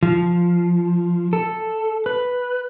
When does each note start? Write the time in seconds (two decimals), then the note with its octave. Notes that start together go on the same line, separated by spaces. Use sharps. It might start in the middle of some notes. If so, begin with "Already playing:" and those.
0.03 F3
1.33 A4
2.06 B4